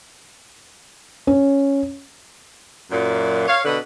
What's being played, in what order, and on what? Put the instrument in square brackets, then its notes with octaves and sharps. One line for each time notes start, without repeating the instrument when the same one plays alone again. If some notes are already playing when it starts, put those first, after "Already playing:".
[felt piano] C#4
[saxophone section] F#2 A#2
C#5 F5
B2 D3 B4 D#5